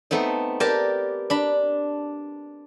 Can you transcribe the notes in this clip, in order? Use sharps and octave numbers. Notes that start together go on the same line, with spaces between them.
A3 B3 C4 D#4
G4 A#4 B4 D5 G5 A5
D4 B5